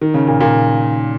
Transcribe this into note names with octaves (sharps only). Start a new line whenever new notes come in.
D#3
C#3
A#2
A#2